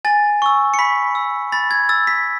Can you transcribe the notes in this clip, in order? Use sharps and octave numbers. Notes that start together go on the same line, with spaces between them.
G#5 A6
C#6 E6
C#7
B5 B6
E6
B5 A6
G#6
E6 A6
B6